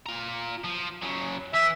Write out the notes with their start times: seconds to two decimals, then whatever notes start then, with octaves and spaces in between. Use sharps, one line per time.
0.06 F4 A#5
0.64 F3
1.02 C#3 F#3
1.54 E3 E5